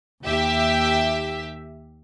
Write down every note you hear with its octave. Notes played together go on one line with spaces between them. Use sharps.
D#2 G4 E5